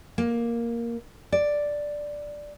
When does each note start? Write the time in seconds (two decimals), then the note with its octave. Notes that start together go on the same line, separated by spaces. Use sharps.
0.18 A#3
1.32 D5